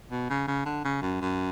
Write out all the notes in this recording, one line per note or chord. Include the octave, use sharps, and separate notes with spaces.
B2
C#3
C#3
D3
C#3
F#2
F#2